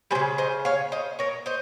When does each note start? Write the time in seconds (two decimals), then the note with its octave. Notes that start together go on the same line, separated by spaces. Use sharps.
0.11 G3 G#4 C5
0.15 C#3
0.38 C5 D#5
0.65 C#5 F5
0.92 C5 D#5
1.19 A#4 C#5
1.46 C5 D#5